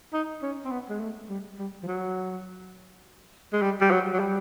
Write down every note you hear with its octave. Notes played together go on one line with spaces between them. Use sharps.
D#4
C#4
C4
B3
G#3
A3
G3
G3
F3
F#3
G#3
G3
G3
F#3
F#3
G3